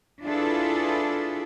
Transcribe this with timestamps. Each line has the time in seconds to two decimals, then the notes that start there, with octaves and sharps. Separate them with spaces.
0.23 D4 E4 F4 G#4 A4 B4